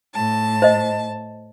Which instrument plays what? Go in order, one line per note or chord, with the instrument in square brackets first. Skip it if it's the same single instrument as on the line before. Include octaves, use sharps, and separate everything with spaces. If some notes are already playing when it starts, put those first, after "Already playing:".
[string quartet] A2 A5
[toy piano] C5 D#5